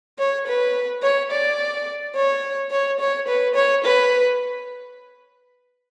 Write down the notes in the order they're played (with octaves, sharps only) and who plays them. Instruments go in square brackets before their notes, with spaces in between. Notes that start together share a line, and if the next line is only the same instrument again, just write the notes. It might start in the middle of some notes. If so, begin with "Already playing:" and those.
[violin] C#5
B4
C#5
D5
C#5
C#5
C#5
B4
C#5
B4